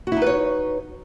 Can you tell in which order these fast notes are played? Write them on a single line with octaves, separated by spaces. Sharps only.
F#4 E4 D#4 B4 C#5